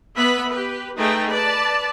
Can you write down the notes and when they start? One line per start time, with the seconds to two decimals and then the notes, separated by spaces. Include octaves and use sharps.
0.16 B3 B4 E5 B5
0.50 G4 B4
0.96 A3 D#4 G#4 A4 B4 G5
1.29 B4 D5 A5